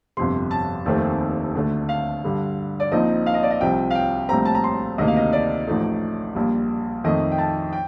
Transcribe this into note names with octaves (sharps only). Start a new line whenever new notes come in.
G1 F2 C3 C6
A5
F1 D#2 D#3 A3 C4
D2 D3 A3
F5
G2 D3 G3
D5
A#1 A#2 F3 C4 D#4 D#5
F5
D#5
D5
D#5
C2 C3 F3 G5
F5
G5
A#1 A2 G3 C4 A#5
A5
A#5
C6
D2 C3 D#3 A#3 D#5
F5
D#5
D5
A1 A2 F3 A3 D#4
A#1 A#2 G3
F2 D#3 A3 D#5
G5
A5
G5